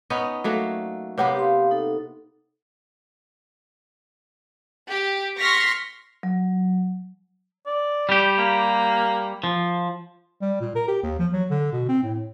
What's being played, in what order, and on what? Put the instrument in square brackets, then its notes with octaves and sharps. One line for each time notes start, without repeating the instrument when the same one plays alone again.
[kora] B3 C#4 D#4
F#3 A3 A#3
[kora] C3 A#3 B3 [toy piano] B4 C#5 F#5
[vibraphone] G4 F5 C6
D#4 A4
[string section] G4
C6 C#6 F6 A#6 B6
[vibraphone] F#3
[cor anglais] D5
[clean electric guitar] G3 G4
[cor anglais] A#3
[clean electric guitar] F3
[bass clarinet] G3
A#2
A#4
G4
D#2
F3
F#3
D3
B2
C4
A2